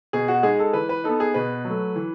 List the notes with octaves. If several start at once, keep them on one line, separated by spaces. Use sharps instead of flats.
B2 G#4
F#4
G#3 D#4 G#4
A4
E3 B4
B4
B3 D#4 A4
G#4
B2 B4
F#3 A3
E3